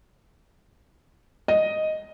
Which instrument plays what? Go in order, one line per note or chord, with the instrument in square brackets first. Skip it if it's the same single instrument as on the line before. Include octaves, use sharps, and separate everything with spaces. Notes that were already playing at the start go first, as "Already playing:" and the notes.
[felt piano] D#5